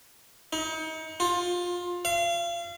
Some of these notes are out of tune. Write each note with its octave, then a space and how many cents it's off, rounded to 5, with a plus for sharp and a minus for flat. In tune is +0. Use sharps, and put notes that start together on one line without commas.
D#4 +35
F4 +20
F5 -35